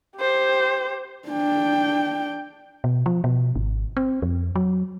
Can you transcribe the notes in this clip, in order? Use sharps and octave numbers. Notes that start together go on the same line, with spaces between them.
G4 C5
D4 G5
B2
F3
B2
G#1
C4
F2
F#3